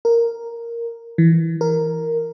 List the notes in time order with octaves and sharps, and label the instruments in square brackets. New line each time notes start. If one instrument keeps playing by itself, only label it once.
[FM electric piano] A#4
E3
A#4